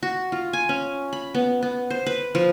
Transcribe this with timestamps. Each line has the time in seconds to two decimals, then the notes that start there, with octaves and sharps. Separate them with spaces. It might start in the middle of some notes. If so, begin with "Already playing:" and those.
0.03 F#4
0.32 F4
0.53 G#5
0.69 C#4
1.13 B5
1.35 B3
1.63 B3
1.90 C5
2.06 B4
2.35 F3